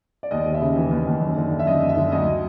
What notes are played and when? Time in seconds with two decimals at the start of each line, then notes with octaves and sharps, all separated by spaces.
0.23 D5
0.31 D#2 D#5
0.46 D#2
0.54 E5
0.61 C#3
0.76 E3
0.91 D#2
1.07 D#2
1.22 F#2
1.37 D3
1.51 D3
1.59 E5
1.67 F#2 D#5
1.82 F#2
1.89 E5
1.97 D3
2.12 D2 D#5